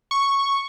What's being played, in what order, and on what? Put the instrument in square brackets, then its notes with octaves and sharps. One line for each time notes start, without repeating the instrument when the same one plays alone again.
[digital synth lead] C#6